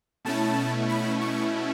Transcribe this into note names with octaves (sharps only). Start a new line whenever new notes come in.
B2 A3 C#4 E4 A5
B5
C#6